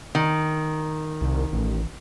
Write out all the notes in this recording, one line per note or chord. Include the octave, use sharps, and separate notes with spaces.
D#3
C2
A1